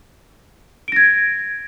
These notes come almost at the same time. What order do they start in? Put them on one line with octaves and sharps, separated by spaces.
D7 A#6 G#6